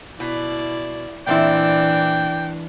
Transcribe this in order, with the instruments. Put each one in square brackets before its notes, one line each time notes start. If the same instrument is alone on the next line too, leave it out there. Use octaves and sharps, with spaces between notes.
[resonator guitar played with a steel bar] B2 [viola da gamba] E4 D5
[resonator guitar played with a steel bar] A#2 C4 E4 [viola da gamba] E3 D4 [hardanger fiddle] D5 [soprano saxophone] G5